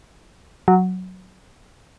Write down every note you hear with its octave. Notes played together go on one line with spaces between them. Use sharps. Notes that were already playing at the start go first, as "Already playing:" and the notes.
F#3